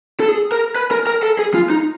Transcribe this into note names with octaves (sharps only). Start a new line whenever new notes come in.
A4
G#4
A#4
B4
A#4
A#4
A4
G#4
F4
D#4